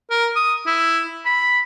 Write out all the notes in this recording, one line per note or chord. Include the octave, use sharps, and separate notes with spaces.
A#4
D#6
E4
B5